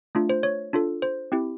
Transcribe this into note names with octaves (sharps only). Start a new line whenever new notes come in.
A3 D4 F4
C5
C#5
D4 F4 A4
C5
C4 E4 G4